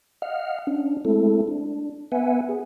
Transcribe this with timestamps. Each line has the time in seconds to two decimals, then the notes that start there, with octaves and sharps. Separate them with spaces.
0.22 D#5 F5 F#5 F6
0.67 C#4 D4
1.05 G#3 A3 C4 E4 A4
1.48 D4
2.12 B3 B4 E5 F#5 G#5
2.49 G#4